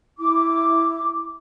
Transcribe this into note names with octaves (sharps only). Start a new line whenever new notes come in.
E4 D6